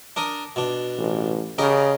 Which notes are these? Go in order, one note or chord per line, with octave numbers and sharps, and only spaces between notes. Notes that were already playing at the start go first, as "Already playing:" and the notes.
D4 A#4 D#6
B2 D4
A1
C#3 G4 A#4 D#5